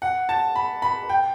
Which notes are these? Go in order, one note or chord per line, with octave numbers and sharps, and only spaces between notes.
F#5
A5
B5
B5
G5